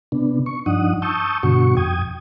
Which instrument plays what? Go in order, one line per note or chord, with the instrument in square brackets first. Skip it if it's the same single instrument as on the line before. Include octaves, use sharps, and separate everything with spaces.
[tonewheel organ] C3 B3 D4
C#6
G2 F3 D4 D#4 F#5 D#6
A5 C#6 D#6 E6 G6
G2 B2 D3 F#4 C#6
F2 G5 D#6 G#6